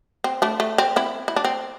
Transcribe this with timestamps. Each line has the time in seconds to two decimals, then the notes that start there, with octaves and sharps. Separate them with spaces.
0.24 C4
0.42 A3 D4
0.60 A3
0.78 C4
0.96 C4 E4
1.28 E4
1.36 D4
1.45 C4